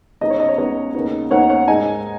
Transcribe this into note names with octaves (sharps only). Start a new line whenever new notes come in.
C#2 C#3 B3 D#4 D#5
C#5
D#5
C#5
C#2 C#3 B3 D#4 D#5
D#2 C#3 B3 D#4
D#2 C#3 B3 D#4 C#5 F#5
C#5 F#5
G#2 G#3 D#4 D#5 G#5